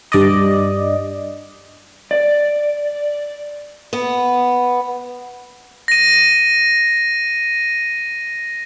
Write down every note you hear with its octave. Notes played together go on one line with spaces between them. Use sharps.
G2 D5 D#5
D5
B3
A#6 D#7